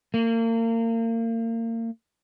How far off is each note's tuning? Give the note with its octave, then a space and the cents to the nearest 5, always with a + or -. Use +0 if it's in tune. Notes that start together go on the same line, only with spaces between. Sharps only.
A#3 -35